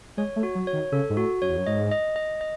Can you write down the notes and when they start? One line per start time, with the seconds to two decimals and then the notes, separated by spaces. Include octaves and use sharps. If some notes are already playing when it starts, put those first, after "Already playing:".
0.17 G#3 C#5
0.36 A3
0.43 F#4
0.55 F#3
0.67 C#5
0.73 D#3
0.92 C#3 A4
1.10 G#2
1.17 A2 F#4
1.42 F#2 C#5
1.49 E2
1.58 F#2
1.67 G#2 D#5
1.91 D#5
2.16 D#5
2.41 D#5